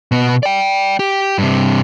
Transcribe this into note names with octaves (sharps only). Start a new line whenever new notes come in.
B2 B3
D5 G5
G4
G2 C3